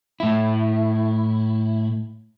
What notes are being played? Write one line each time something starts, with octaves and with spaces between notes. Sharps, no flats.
A2 E4